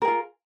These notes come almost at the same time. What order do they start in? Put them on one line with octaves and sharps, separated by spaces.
A#4 G#4 F4